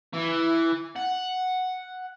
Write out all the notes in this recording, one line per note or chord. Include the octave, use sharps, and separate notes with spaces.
E3
F#5